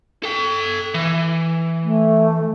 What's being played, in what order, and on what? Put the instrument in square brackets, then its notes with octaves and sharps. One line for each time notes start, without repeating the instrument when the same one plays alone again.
[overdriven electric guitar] A4 G5
E3
[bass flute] A3